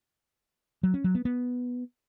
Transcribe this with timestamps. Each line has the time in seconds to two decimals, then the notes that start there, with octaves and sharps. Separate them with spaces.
0.83 F#3
0.94 C#4
1.04 F#3
1.15 B3
1.25 B3